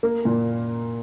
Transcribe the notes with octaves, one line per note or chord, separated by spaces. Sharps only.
A#3
A#2